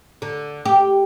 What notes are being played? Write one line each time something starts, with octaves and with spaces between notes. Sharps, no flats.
D3
G4